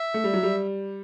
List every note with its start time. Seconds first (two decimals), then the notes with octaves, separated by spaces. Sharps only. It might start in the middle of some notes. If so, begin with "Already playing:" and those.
Already playing: E5
0.14 A3
0.24 G3
0.33 F#3
0.43 G3